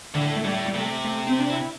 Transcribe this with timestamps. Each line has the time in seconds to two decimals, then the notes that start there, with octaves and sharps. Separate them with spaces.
0.14 A2 D3
0.36 A3
0.44 A2 G3
0.66 G3
0.74 C3 A3
1.05 A3
1.27 C4
1.39 D4
1.50 E4